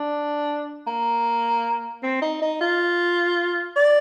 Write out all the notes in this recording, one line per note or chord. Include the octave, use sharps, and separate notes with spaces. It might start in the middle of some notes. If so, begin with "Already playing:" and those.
Already playing: D4
A#3
C4
D#4
D#4
F4
D5